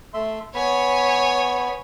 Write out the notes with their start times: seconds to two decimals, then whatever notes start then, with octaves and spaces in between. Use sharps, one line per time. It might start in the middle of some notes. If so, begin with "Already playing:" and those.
0.14 A3 E5 C6
0.55 B3 C#5 G#5 B5